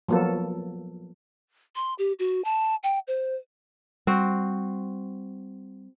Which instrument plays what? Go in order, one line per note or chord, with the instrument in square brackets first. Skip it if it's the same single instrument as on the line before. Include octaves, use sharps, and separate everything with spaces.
[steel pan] F3 F#3 A#3 B3 A4
[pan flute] C6
G4
F#4
A5
G5
C5
[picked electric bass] G3 [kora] C4 F#4 C5